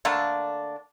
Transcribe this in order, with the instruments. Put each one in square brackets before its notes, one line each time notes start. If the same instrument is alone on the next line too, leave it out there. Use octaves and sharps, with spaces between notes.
[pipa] D3 A3 A#3 D4